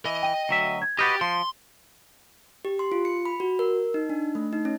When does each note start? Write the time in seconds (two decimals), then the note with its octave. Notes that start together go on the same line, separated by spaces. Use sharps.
0.06 E3 D#5
0.23 G5
0.49 D2 F#3 E5
0.82 G#6
0.99 F#4 G4 B4 D#5 F6 G6 A6
1.21 F3 C6
2.65 G4
2.79 C6
2.92 F4
3.05 C#7
3.25 B5
3.40 F#4
3.59 A#4
3.94 D#4
4.10 D4
4.35 A3
4.53 D#4
4.65 C#4